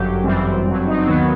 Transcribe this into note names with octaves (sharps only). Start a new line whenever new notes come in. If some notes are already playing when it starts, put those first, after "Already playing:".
Already playing: G1 F#2 F#3 G4
G1 F#2 E3 G3 C4
G1 G2 F#3
D#4
C4
D#2 D#3 F#3 B3